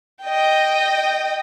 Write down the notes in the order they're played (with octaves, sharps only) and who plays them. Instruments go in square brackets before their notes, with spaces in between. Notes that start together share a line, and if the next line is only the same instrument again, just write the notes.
[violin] D#5 G5